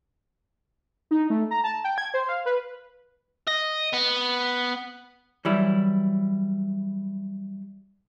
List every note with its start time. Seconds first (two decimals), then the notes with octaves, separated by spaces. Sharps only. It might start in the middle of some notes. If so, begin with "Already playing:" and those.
1.11 D#4
1.30 A3
1.51 A#5
1.64 A5
1.84 G5
1.98 G#6
2.14 C5
2.29 F5
2.46 B4
3.47 D#5
3.94 B3
5.45 E3 F#3 G3 E4